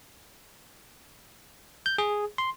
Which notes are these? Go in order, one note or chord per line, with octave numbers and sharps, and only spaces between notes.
G6
G#4
C6